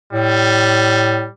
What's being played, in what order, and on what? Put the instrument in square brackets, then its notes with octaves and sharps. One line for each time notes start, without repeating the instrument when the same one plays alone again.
[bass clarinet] A2 [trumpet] G3